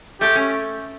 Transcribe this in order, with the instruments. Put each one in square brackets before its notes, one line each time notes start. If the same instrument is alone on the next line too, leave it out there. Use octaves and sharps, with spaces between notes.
[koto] A3 [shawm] G4
[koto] C#4